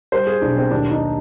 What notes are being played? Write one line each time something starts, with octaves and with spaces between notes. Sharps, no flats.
G3 C5
G#4
B1 D4
C4
D#2 D4
D#4